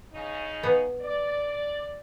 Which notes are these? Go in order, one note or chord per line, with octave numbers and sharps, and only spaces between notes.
C#3 D#4
B3
D5